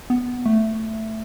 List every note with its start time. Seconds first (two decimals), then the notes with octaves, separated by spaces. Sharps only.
0.10 B3
0.46 A3